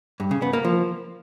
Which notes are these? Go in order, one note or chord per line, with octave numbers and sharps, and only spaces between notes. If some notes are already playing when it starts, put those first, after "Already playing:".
G2
C#3
B3
A#3
F3